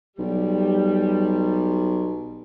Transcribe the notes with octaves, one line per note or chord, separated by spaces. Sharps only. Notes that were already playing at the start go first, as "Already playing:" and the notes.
B1 G3